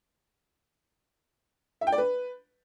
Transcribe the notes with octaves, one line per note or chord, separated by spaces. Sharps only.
E5
G5
D5
B4